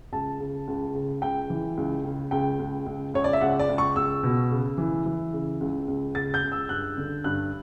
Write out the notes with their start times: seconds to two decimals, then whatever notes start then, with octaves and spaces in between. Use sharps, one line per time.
0.12 C#2 A5
0.40 C#3
0.67 C#2
0.94 C#3
1.22 C#2 G5
1.50 E3
1.77 C#2
2.05 C#3
2.31 C#2 G5
2.59 C#2
2.86 C#2
3.14 C#2 C#5
3.24 D5
3.33 E5
3.41 C#2 F#5
3.59 D5
3.69 C#2
3.78 C#6
3.96 C#2 E6
4.23 B2
4.51 C#3
4.78 E3
5.06 E3
5.33 C#3
5.61 C#2
5.88 C#2
6.15 C#3 A6
6.34 G6
6.42 C#2
6.52 E6
6.69 G2 F#6
6.97 D3
7.24 G2 F#6